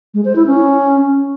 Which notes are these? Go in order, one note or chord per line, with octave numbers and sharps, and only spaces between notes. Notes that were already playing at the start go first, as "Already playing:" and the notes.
G#3
C5
E4
C#4